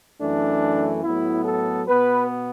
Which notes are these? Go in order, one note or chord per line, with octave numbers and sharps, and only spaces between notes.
F#2 E3 A3 D4
A2 F#3 B3 E4
A4
B2 B3 B4